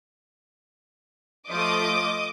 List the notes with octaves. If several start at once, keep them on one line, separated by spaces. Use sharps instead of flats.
F3 A3 D#5 D6 D#6